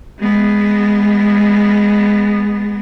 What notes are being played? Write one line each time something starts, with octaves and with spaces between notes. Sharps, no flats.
G#3 B3